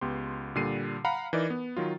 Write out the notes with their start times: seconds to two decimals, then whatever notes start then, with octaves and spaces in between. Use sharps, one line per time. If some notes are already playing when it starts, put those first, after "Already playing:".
0.01 C#2 B3 G4 C6
0.55 A#2 D3 G3 C7 D#7
1.05 F5 F#5 A#5 B5
1.33 E3 D#4 A#4 D5
1.50 B3
1.77 D#3 F#3 F4